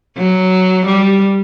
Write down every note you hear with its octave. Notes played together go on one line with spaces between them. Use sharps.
F#3
G3